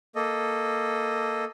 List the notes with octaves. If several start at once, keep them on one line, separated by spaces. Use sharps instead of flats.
A#3 A4 D#5